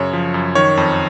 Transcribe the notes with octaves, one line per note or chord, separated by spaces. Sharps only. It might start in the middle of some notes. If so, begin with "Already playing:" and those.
Already playing: F#2 C#3 C#5
F3
F#2
D#3 C#5
F2